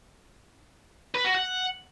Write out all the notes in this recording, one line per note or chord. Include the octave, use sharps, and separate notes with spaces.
B4
F#4
F#5